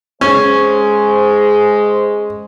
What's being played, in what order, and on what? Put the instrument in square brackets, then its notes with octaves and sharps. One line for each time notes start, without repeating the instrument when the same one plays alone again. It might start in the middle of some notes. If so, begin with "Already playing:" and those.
[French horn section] G#3 C5 [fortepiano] C#4